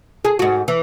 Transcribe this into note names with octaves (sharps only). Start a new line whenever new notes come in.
G#4
G#2 F#4
E3